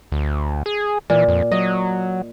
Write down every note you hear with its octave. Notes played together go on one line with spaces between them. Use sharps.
D2
G#4
A#2 E3
F2
F#3 D#5